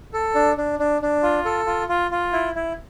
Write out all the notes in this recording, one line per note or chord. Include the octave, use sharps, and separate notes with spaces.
A4
D4
D4
D4
D4
F4
A4
F4
F4
F4
E4
E4